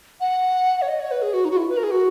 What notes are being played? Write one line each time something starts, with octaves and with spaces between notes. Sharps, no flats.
F#5
C#5
D#5
C#5
B4
G#4
F#4
D#4
F#4
E4
B4
A#4
G#4
F#4